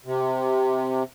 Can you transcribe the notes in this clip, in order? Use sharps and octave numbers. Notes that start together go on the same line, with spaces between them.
C3